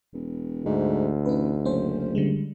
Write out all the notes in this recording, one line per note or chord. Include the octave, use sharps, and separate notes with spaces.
E1
D2 G#2
A1 D#4 B4
F#1 C#4 C5
D3 G3 G#3